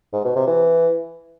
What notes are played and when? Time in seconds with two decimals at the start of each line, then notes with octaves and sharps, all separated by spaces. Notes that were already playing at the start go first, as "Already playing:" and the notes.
0.13 G#2
0.24 B2
0.36 C3
0.47 E3